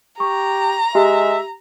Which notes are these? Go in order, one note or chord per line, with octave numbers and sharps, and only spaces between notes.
G4 A#5 C#6
G#3 G4 E5